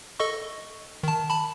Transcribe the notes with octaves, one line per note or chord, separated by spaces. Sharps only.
A4 D#5 C#6
D#3 A5
A5 B5